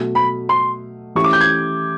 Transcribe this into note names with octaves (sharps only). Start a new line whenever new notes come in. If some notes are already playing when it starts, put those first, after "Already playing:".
Already playing: B2 F#3 A3
B5
C6
E3 A3 C#4 E4 G4 C#6
D6
G6
G#6